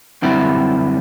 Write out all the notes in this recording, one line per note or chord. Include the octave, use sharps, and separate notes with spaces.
F#2 D3 G3 C4 E4